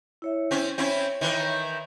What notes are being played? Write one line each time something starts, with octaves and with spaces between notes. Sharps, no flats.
E4 C#5 E5
C4 C#4
C4 C#4 E4 C#5
D#3 E3